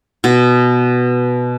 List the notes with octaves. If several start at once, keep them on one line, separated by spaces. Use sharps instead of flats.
B2